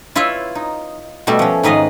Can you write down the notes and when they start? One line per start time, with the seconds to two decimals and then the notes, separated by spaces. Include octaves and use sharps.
0.15 E4 F4 B4 C#5 E5
0.55 D#4
1.27 B2 G3 A3 F#4
1.39 F3 C#4
1.63 G#2 D#3 B4 D#5 F5